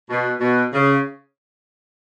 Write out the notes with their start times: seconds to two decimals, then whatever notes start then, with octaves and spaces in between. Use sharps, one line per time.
0.09 B2
0.40 B2
0.73 C#3